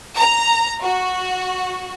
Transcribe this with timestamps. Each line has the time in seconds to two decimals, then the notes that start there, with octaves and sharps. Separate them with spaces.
0.16 A#5
0.82 F#4